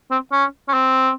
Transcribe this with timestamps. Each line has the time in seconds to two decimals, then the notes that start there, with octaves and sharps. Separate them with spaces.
0.11 C4
0.32 C#4
0.69 C#4
0.73 C4